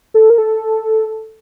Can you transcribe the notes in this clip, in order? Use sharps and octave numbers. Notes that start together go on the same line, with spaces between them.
A4
A#4
A4